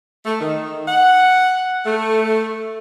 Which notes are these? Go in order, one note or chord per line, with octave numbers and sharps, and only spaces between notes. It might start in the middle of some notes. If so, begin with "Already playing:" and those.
A3
D#3
F#5
A3